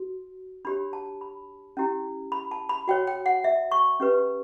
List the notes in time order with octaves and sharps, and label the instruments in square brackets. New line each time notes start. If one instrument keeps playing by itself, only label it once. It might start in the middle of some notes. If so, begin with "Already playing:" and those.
Already playing: [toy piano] F#4
D4 G4 C#5 B5
A5
B5
C#4 E4 G4
B5
A5
B5
F#4 C#5 G5
G5
F#5
E5
C#6
C#4 G4 B4